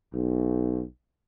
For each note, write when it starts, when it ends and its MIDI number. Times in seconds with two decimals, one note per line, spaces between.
0.12 0.82 35